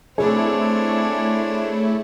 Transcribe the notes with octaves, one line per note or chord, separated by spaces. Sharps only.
A3 C4 D4 E4 G#4 C#5